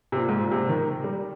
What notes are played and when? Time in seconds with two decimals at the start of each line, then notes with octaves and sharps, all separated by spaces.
0.12 C3
0.17 A#2
0.29 G#2
0.39 A#2
0.51 C3
0.69 D#3
1.04 G3